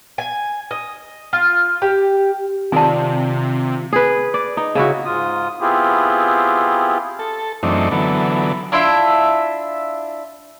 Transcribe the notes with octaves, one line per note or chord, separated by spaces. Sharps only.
G#5
D#5
F4
G4
C3 D#3 C4 F4 D5 G#5 A5
G#4 B4
D5
D#4
C#3 E4 F#4
G#2 F4 D#6
B3 C4 E4 F4 G4 G#4
A4
F#2 E3 A3 C4 D4 D#4
D3 E3 F#3 B3 A4
D4 E4 F4 E5